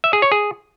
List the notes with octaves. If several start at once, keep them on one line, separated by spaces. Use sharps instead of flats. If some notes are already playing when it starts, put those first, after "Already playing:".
E5
G#4
C#5
G#4